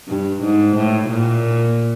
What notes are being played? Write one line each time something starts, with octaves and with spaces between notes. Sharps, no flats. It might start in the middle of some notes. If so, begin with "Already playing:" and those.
G2
G#2
A2
A#2